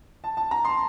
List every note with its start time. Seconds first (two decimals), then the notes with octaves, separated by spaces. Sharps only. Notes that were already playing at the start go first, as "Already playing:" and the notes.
0.24 A5
0.37 A5
0.51 A#5
0.65 C6